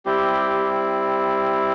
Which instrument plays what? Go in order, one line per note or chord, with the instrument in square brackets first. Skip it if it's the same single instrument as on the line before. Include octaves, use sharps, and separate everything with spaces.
[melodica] G3 C4 E4 G4